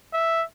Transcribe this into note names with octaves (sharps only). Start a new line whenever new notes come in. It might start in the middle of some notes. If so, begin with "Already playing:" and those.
E5